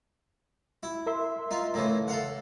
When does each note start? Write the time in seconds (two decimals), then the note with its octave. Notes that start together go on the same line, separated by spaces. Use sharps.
0.83 E4
1.06 A#4 E5 C6
1.51 D#4 F4
1.74 A2 C#3 E3
2.08 A4 F5 F#5